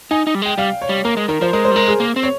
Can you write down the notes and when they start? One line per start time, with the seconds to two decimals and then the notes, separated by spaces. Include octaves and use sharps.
0.11 D#4 G#5
0.27 D#4
0.35 G3
0.42 G#3 G5
0.58 G3 F5
0.82 C#5
0.89 G3
1.05 A#3 A#4
1.17 G#3
1.28 D#3 A#4
1.41 F3 C5
1.53 G#3 A#4
1.65 C5
1.71 G3
1.76 G#3 A#4
1.88 G#4
2.00 A#3
2.16 C4
2.23 C#5